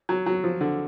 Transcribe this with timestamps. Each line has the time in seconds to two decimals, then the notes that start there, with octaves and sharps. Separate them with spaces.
0.09 F#3
0.26 F#3
0.44 F3
0.61 D3